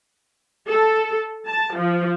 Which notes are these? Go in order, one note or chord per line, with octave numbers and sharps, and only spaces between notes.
A4
A5
F3